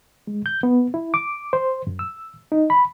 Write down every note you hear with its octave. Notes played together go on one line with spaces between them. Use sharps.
G#3
G6
B3
E4
D6
C5
F#2
E6
D#4
B5